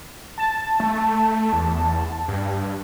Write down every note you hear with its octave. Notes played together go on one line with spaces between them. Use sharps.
A5
A3
E2
G2